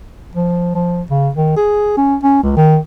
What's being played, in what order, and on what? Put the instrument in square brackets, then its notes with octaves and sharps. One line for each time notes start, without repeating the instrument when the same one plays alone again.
[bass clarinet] F3
F3
C#3
D#3
G#4
C#4
C#4
C#2
D#3